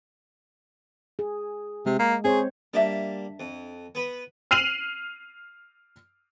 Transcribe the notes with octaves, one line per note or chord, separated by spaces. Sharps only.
G#4
C3 G#3
A#3
C4 G#4 C5 C#5
G3 A#3 D4 D#5 E5 A5
F2
B3 B4 B5
F6 C7 D#7 F7 F#7